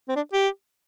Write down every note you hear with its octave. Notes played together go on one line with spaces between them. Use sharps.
C4
D4
G4